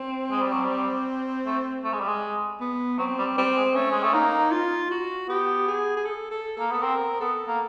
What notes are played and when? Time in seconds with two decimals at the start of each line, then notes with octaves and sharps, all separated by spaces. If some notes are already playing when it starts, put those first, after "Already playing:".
Already playing: C4
0.31 G#3
0.42 G3
0.52 F#3
0.64 G3
1.46 A3
1.84 A3
1.93 G#3
2.00 G3
2.08 G#3
2.61 B3
2.99 F#3 C4
3.19 G3
3.38 G3 C4
3.57 G#3
3.75 A3 C#4
3.91 G#3
4.03 A3
4.14 A#3 D#4
4.52 F4
4.91 F#4
5.29 B3 G4
5.68 G#4
5.97 G#4
6.05 A4
6.31 A4
6.57 A#3 A4
6.71 B3 A4
6.82 C4 A#4
7.21 B3 A4
7.47 A#3